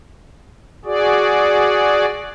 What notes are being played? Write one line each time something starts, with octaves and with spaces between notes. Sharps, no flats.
F#4 G#4 D5